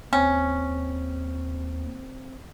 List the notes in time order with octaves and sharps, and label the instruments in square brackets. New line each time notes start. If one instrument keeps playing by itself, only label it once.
[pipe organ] D#2 [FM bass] C4 [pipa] C#4